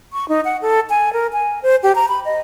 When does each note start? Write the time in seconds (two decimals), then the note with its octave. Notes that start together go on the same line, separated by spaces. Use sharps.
0.13 C#6
0.29 D#4
0.45 F#5
0.62 A4
0.90 G#5
1.13 A#4
1.33 G#5
1.62 C5
1.83 G4
1.95 A#5
2.08 B5
2.25 D#5